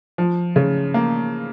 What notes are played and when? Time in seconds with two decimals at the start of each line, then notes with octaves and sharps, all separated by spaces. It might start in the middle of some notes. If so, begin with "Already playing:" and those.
0.18 F3
0.56 C#3
0.94 A#3